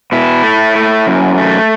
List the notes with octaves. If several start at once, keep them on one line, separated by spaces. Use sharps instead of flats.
B2 E4
A3
A3
F#2
A3